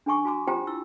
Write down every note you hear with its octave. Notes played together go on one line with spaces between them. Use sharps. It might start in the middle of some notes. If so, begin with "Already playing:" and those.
D4 G#4 G#5 C#6 D6
F#4 G#5 A#5 D6
F4 G4 C5 G5 A#5
E4 E6